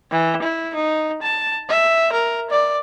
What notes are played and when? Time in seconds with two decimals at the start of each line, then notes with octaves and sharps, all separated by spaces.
0.11 E3
0.42 E4
0.75 D#4
1.22 A5
1.69 E5
2.12 A#4
2.50 D5